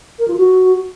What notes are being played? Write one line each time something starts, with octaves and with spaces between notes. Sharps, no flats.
A#4
F4
F#4